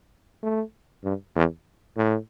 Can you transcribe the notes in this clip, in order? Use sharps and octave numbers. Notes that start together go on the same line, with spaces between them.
A3
G2
E2
A2